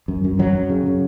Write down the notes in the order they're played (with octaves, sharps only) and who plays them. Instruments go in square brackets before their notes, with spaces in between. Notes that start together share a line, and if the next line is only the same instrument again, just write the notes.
[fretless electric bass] F#2
F#2
F#2 F#3
F#2
C#3
C#3